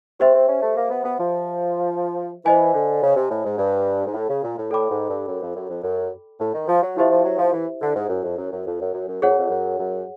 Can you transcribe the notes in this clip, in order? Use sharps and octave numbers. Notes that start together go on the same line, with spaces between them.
C4 G4 C5 E5
C4
C#4
A3
A#3
B3
B3
F3
E3 C5 D#5 G#5
D3
C#3
C3
A2
G#2
G2
G#2
A2
C#3
A#2
A2
A2 A4 D5 G5 B5 D6
G#2
G2
F#2
F2
F#2
F2
F#2
A2
D#3
F3
F#3
F3 E4 G4 C5 E5
F3
F#3
F3
E3
D3
G#2
F#2
F2
F#2
F#2
F2
F#2
F#2
F#2
F2 G#4 C#5 F#5
F#2
F2
F#2
F#2